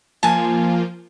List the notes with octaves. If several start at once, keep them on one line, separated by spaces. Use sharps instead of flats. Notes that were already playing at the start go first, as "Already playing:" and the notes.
F3 A#3 F4 G#5 A5